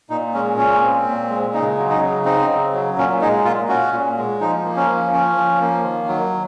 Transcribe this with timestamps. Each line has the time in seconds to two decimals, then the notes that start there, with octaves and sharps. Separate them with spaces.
0.10 A#2 D#4
0.34 G#3 C#4
0.58 A#2 C#4
0.82 C4
1.06 A#2
1.30 G#3
1.54 C#3 D#4
1.78 F#3
1.90 D#4
2.01 C#3
2.25 C4 D#4
2.49 C#3
2.73 F#3
2.97 A#2 C#4
3.21 G#3 D#4
3.45 A#2 F4
3.69 C#4 F#4
3.92 A#2
4.17 G#3
4.41 F3 D#4
4.65 A#3
4.76 C#4
4.88 F3
5.13 C#4
5.37 F3
5.61 A#3
5.84 D#3
6.08 F#3